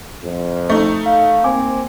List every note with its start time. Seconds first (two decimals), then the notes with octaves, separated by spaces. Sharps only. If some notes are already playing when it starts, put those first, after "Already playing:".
0.23 F2
0.70 A3 D#4
1.06 F5
1.44 A#3 C4 G#5 D6